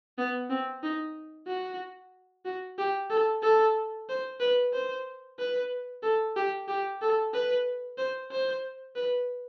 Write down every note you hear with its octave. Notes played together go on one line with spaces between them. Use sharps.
B3
C4
D#4
F#4
F#4
G4
A4
A4
C5
B4
C5
B4
A4
G4
G4
A4
B4
C5
C5
B4